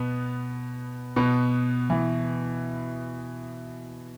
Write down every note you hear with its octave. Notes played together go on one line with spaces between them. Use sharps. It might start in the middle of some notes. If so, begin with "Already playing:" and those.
Already playing: B2 B3
B2 B3
E3